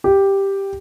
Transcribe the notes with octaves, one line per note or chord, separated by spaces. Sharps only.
G4